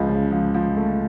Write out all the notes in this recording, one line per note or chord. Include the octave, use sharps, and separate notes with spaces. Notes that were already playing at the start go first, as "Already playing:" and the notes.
Already playing: C#2 F3
C#3
F3
F3
A3